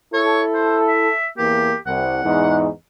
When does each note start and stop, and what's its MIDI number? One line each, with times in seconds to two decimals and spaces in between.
0.14 1.09 64
0.14 1.09 69
0.14 0.42 73
0.54 0.78 72
0.88 1.27 76
1.38 1.73 40
1.38 1.73 58
1.38 1.76 67
1.87 2.22 36
1.87 2.59 78
2.25 2.68 40
2.25 2.68 44
2.25 2.68 63